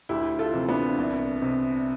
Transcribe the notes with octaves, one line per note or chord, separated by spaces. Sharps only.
D2 E4 G4
F4 A4
C3 E3
B3 D4
C2
C3